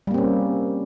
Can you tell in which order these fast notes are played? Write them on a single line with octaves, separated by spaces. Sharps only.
G3 A#3 C4 C#4